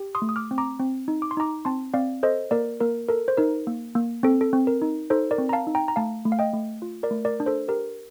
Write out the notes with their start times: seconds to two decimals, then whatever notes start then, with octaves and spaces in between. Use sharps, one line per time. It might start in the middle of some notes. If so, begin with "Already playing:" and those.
Already playing: G4
0.15 C6 D#6
0.22 A3
0.29 D#6
0.36 D6 F6
0.51 C4
0.58 A#5 D6
0.79 C4
1.08 D#4
1.22 D6
1.31 C6
1.37 D#4 A#5 D6
1.65 C4 A5 C6
1.94 C4 D5 F5
2.23 A4 C5 D#5
2.51 A#3 A#4 D5
2.80 A#3 A#4
3.08 A4 A#4
3.28 C5
3.37 D#4 A#4
3.67 A#3
3.95 A#3
4.23 C4 A4
4.41 A4
4.53 C4
4.67 A#4
4.82 D#4
5.10 D#4 A4 C5
5.31 A#4 D5
5.38 C4
5.49 A#5
5.53 F5 A5
5.67 D#4
5.75 G5 A#5
5.88 A#5
5.96 A3 F5 A5
6.25 A3
6.32 F5
6.39 D#5 G5
6.53 A3
6.82 F4
7.03 A#4 D5
7.11 A3
7.25 A#4 D5
7.40 D4
7.46 A4 C5
7.68 G4 A#4